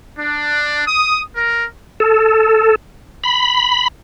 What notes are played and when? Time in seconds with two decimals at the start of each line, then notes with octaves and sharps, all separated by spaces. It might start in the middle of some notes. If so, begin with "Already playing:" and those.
0.17 D4
0.86 D#6
1.35 A#4
2.00 A4
3.24 B5